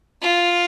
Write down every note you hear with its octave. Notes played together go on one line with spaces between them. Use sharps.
F4